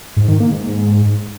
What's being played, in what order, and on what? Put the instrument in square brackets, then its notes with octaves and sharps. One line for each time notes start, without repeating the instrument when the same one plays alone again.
[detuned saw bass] G#2
D#3
A#3
G#2